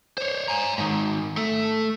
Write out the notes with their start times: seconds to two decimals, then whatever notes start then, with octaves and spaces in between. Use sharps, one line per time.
0.18 C5 C#5
0.48 G#5 A#5
0.78 G#2 D#3
1.37 A3